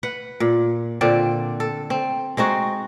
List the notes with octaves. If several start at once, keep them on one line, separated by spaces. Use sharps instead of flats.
B4 F#5
A#2
A#2 D3 C4 D5
A4
C4
G#3 C4 D#4 F#4